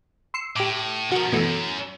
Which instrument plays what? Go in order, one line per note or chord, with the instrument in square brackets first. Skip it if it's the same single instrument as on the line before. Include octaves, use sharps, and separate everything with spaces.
[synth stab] C6 E6 C#7
[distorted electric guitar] A2 [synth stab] G4 D6
[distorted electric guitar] B2 F3 [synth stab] F#4 A#4
[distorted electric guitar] F#2 [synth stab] B2 E3 A3